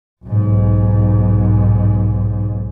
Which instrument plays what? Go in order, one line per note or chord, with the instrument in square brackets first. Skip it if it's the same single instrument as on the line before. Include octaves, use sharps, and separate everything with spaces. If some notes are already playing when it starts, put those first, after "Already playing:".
[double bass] B1 G#2